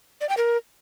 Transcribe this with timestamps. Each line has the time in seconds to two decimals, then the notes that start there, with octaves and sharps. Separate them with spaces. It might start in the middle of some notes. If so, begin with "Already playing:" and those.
0.21 D5
0.29 G5
0.37 A#4